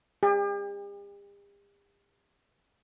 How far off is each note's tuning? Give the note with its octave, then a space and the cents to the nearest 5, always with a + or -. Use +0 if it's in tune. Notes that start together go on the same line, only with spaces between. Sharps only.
G4 +45